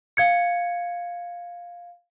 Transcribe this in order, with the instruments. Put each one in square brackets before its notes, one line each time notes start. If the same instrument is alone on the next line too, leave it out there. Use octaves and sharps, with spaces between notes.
[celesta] F5 G#6 C#7